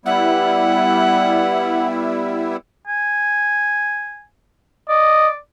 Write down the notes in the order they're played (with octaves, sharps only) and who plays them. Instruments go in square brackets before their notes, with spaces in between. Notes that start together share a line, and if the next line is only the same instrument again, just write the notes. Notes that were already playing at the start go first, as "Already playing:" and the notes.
[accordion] G3 B3 E4 [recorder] F#5
[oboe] G#5
[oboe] D5 [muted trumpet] D#5